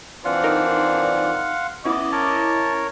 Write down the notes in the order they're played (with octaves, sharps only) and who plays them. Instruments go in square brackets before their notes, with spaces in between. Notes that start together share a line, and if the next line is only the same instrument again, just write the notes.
[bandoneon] E3 F4 [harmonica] C4 D4 D5 [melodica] F5 F#5 C6
[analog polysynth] D#4 A#4
[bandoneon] B3 [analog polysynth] C#4 E4 [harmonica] D#5 E5 D6
[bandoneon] A#4 C#5 [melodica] A5